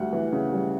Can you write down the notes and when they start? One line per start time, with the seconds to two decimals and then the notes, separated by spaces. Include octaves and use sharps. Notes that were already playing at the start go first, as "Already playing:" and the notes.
Already playing: D2 G3 F#5
0.13 E3
0.32 C#3
0.53 G3